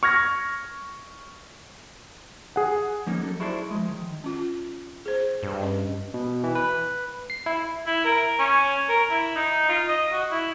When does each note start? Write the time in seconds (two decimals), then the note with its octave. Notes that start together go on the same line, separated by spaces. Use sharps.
0.03 C#6 F6 G#6 A#6
2.56 G#4 F#5
3.07 F3 A#3 C#4 D#4
3.22 F#3 A4
3.40 E4 F#4 G#4 A4 C5 D5
3.71 F3 G#3
3.89 D#3
4.24 C#4 F4
5.06 G#4 C5
5.43 G2
5.61 C#4 D#5
6.14 B2
6.44 E3
6.55 B4
7.30 C7
7.46 E4
7.86 E4
8.04 A#4
8.39 C#4
8.89 A#4
9.10 E4
9.35 D#4
9.69 F4
9.88 D#5
10.12 F#4
10.31 E4